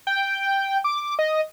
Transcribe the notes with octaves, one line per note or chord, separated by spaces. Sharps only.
G5
D6
D#5